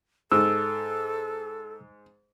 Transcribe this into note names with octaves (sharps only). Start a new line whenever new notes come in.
G#2 A4 E6